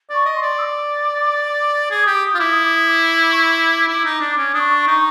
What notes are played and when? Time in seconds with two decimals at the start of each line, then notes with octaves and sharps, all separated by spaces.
0.10 D5 C#6
0.25 D#5
0.37 C6
0.42 D5
0.58 E6
0.62 D6
1.91 G#4 D6
2.03 G4 D#6
2.15 D6
2.27 D#6
2.35 F4
2.39 E4 D6
2.52 D#6
2.64 D6
2.76 D#6
2.87 D6
3.22 D6
3.32 C#6
3.41 D6
3.88 E4
4.05 D#4
4.21 D4
4.37 C#4
4.54 D4 D#6
4.60 C#6
4.87 D#4